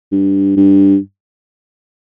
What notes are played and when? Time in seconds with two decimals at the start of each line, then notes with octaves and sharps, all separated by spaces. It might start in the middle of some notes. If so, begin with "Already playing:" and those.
0.12 G2
0.57 G2